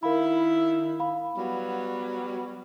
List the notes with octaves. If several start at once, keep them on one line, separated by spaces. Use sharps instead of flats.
D#3 E4 A#4 F5 B5
F5 B5
F#3 G3 B3